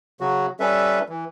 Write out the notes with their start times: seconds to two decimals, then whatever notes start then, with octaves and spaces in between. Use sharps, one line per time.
0.20 C#3 F#3 F#4
0.60 G3 C#4 A4 B4 E5
1.09 E3